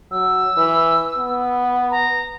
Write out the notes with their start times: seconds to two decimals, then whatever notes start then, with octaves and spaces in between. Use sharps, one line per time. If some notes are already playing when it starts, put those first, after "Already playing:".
0.11 F#3 E6
0.57 E3
1.18 B3
1.91 A#5